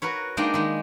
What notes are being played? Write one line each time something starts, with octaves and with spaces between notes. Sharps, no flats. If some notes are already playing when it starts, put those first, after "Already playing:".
F#4 A#4 B4 C#5
G#3 A#3 D4 D#4 G5 A#5
D#3 G#3